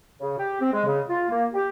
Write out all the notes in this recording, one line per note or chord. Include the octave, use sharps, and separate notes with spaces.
C#3
G4
C4
G#3
C#3
F4
A#3
G4